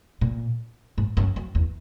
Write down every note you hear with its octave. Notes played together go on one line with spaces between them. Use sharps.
A#2
G#2
F#2
F#2
E2